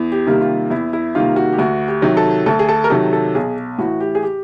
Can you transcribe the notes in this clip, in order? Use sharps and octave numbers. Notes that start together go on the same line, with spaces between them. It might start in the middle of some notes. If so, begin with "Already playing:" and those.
Already playing: E2
G4
C3 D#3 G3 A#3
F4
E2 E4
E4
C3 D#3 G3 A#3 F4
F#4
G4
D2 F#4
G4
C3 D#3 F#3
A4
D2 A4
G#4
A4
A#4
C3 D#3 F#3 A4
A4
B1 G#4
A2 E3 F#4
G4
G#4
G4